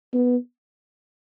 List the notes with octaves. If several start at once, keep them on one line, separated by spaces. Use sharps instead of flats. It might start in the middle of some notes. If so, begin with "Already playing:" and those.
B3